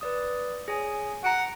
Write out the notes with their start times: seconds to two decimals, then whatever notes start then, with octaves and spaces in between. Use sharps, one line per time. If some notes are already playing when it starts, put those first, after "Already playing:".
0.01 B4 D5 D#6
0.68 G#4 C#5 G#5
1.24 F#5 A#5 D7